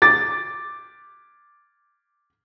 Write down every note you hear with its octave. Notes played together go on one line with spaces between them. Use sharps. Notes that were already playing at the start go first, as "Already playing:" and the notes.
D6 A6